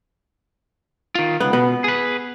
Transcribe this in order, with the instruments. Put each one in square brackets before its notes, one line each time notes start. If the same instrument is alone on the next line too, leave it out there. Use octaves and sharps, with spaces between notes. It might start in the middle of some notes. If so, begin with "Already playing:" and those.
[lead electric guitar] D#3 F4
[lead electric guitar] C#2 [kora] B3
[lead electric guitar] B2 [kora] B3
[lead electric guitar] G#4 B4